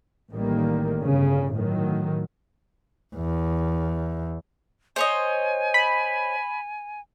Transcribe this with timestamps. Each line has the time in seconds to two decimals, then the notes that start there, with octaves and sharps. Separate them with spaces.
0.31 A1 D#3 G3 A#3
1.03 G1 C#3
1.53 A2 D#3 F#3
3.15 E2
4.96 C5 C#5 D#5 G#5
5.74 B5